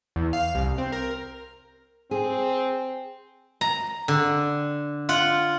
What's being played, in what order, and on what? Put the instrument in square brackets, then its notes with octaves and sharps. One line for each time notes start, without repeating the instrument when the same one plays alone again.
[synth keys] E2
F5
C2
C4
A#4
[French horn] C4 [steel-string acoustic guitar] G#4
[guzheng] A#5
D3
F4 F#5